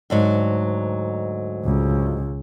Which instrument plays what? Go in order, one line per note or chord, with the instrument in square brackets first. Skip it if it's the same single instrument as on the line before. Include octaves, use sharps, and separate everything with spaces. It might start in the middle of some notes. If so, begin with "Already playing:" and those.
[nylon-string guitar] D2 G#2 F#3
[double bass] C#2